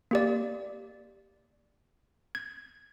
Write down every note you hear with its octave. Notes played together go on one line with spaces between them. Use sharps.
A#3 G4 D5
G#6